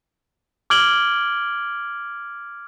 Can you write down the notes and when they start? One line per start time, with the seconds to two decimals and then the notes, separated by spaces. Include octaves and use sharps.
0.70 D6 F6 G#6 D7 F#7 G7